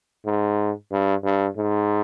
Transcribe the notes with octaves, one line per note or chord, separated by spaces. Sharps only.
G#2
G2
G2
G#2